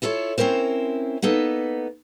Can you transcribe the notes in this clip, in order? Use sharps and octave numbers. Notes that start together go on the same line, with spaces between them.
E4 F4 A4 A#4 C#5
C4 C#4 E4 A#4 C5
A#3 B3 D#4 A4